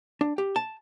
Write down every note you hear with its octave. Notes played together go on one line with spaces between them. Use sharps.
D4
G4
A5